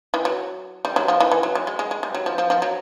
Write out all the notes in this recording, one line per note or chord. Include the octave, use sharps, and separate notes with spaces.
E3
F#3
G3
F#3
F3
E3
E3
F#3
F#3
G#3
G#3
G#3
G3
F#3
F3
F3
F3
F#3